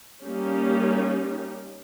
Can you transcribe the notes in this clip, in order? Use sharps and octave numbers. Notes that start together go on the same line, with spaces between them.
G3 A#3 C#4 D#4 G4